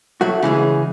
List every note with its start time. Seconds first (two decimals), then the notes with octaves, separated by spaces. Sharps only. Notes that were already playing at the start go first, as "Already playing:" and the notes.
0.21 F#3 A3 F#4
0.43 C#3 E3 G#3 G#4